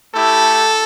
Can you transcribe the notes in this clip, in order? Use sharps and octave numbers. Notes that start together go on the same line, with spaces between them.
A3 E4 G4 A4